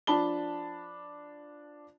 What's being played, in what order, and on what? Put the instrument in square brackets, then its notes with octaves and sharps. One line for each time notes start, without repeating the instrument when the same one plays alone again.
[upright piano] F3 D4 A5 B5 G7